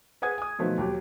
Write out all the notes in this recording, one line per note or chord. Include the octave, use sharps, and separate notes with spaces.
G#4 B4 F#5 G#5 D#6 G#6
G#5 D#6
B2 D#3 F3 F#3 A3 B3
D#2 F#3 G4